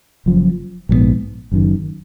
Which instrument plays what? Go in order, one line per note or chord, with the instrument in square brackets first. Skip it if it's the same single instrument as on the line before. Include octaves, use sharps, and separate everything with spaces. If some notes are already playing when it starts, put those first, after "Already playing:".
[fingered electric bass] F#1 F#2 F3
A#1 G#2 F3 B3
F#1 F#2 D#3